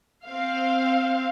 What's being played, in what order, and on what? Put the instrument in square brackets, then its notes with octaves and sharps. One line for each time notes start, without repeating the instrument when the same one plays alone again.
[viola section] C4 F5